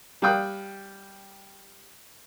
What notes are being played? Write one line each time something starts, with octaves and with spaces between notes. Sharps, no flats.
G3 F5 G5 D#6 F#6